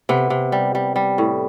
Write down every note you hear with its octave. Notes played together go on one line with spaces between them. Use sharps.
C3 B3
C3
G3
G3
G3
A2